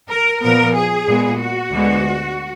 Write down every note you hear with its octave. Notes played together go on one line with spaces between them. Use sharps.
A#4
A#2 F3 B3 A#4
G#4
A#2 G#3 B3
F#4
D2 D3 G#3 B3